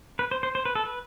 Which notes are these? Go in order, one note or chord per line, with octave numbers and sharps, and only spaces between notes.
B4
C5
C5
C5
B4
A4
B4